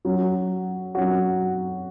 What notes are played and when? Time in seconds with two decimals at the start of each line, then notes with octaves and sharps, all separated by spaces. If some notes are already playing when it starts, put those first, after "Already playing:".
0.05 F#3 C#4 F#4
0.95 F#3 C#4 F#4